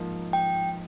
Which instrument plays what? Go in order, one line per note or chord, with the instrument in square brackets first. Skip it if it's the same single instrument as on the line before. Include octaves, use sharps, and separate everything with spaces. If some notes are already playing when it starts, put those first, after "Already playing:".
Already playing: [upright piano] G#2 F3 A#3 D#4
[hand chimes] G5